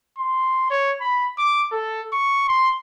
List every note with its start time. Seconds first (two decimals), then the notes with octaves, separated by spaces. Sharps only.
0.18 C6
0.71 C#5
1.01 B5
1.38 D6
1.73 A4
2.13 C#6
2.49 C6